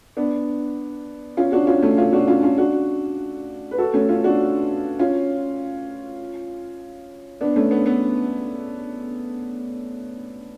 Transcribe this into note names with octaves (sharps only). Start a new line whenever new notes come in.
B3 D4
C#4 F4
D4 F#4
C#4 F4
A3 C#4
C#4 F4
D4 F#4
C#4 F4
C#4 F4
D4 F#4
B4
F#4 A4
A3 C#4
C#4 F4
D4 F#4
C#4 F4
B3 D4
A3 C#4
B3
B3